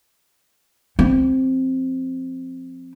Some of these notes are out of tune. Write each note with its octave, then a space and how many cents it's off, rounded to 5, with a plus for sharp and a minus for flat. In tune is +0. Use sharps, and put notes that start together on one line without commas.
F3 +0 C4 +0